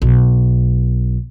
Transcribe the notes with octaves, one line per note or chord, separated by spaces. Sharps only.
B1